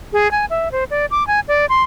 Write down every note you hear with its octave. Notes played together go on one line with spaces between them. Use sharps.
G#4
G#5
E5
C5
D5
D6
G#5
D5
C6